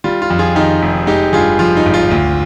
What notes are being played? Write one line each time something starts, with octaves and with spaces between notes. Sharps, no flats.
G3 F4
F4
F2
F4 G#4
D#3 D#4 G4
F1
G#3 D#4 G4
G2 F4 G#4
F3 F4
D#4
G#1
F4
D2